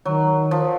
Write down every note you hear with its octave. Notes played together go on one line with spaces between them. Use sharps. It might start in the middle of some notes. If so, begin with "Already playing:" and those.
D#3 F#3
F3